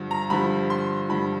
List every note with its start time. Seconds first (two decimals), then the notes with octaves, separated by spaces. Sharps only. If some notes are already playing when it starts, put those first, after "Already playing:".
Already playing: G2 D3 F3
0.11 A#5
0.30 G2 D3 F3 B5
0.70 C6
1.09 G2 D3 F3 B5